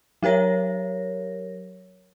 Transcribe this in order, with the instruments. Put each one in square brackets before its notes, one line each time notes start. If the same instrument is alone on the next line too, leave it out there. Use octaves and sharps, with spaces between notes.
[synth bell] F#3 G4 A#4 C#5 A#6